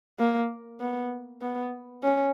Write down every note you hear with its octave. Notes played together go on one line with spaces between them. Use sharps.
A#3
B3
B3
C#4